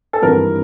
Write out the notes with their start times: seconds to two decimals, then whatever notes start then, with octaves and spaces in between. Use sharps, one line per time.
0.13 A4
0.22 G#1 G2 E3 G3 C4 A#4